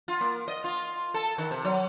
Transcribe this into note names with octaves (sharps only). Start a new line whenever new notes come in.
F4
A#3
D#5
F4
A4
D#3
C3
F#3